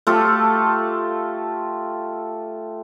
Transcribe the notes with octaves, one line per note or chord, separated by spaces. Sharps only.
A3 F4 G4 A4